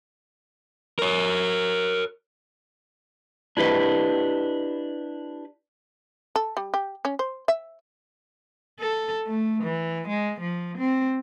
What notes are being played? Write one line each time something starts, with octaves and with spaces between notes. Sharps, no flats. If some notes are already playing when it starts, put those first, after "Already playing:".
A#4 C#5
D4 E4 G4 B4 D#5
A4
G3
G4
C#4
C5
E5
A4
A3
E3
G#3
F3
C4